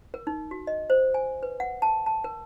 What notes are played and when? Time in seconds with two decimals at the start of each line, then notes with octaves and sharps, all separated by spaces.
0.14 A#4
0.27 D#4
0.51 F#4
0.67 D#5
0.90 C5
1.14 G#5
1.43 B4
1.60 F#5
1.82 A5
2.06 A5
2.24 A#4